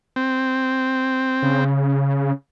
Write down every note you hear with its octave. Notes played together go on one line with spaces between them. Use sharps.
C4
C#3